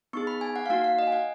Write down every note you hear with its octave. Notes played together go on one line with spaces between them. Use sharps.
B3 D#4 G#4 C#6
B5
G#5
F#5
F5
A#3 D#4 F#4 F#5
F5
D#5
G#5
F#5